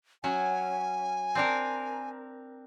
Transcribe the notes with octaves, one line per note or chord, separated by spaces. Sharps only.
F#3 C#4 G#5
C4 D4 A#4